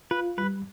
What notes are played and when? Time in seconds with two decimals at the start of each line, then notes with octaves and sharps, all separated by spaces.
0.11 F4 B4
0.38 G3 B4